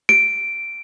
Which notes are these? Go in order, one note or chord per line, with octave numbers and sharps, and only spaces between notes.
D7